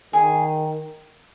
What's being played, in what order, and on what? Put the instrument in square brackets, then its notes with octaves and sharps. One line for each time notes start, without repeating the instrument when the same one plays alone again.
[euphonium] D#3 [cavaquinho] G#4